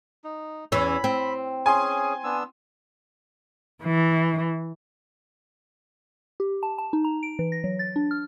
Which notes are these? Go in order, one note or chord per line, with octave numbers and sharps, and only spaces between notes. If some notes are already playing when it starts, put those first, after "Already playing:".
D#4
E2 E3 C#4 B5
C4
C#4 G#4 G#5 C6
B3 D4 E6
E3
G4
A5
A5
D#4
A#5
D7
E3
A#6
F#3
A6
D4
F6